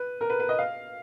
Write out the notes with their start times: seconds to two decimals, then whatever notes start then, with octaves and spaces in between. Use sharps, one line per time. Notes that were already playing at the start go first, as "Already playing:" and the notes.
Already playing: B4
0.21 A#4
0.30 B4
0.40 B4
0.49 D#5
0.58 F5